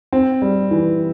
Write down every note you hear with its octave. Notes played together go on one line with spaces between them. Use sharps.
C4
G3
E3